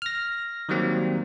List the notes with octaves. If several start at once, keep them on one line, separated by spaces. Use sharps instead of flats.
F6 A#6
D#3 F#3 G3 A#3 C4